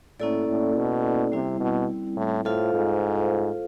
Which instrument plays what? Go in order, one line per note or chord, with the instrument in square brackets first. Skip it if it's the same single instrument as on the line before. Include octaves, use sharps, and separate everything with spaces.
[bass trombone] A2 [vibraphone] A#3 C#4 E4 A4 D5
[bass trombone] A2
B2
[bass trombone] C3 [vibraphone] G3 C4 E4
[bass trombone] B2
A2
[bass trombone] A2 [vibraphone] F4 A4 C5 F5
[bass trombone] G#2